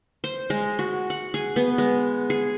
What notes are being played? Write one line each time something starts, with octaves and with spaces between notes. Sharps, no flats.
C5
G#3
F#4
F#5
G#4
B3
G#3
G#4